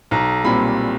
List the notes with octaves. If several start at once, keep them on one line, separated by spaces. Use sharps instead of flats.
B1 A#5
A#2 G3 C4 B5